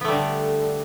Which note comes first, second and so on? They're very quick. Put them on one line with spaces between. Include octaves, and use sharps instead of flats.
B3 A3 G3 D3